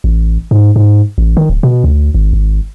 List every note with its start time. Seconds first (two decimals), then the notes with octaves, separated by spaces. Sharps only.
0.04 A1
0.51 G#2
0.76 G#2
1.18 A1
1.37 D#3
1.50 D1
1.63 B2
1.84 D2
2.15 G#1
2.33 G#1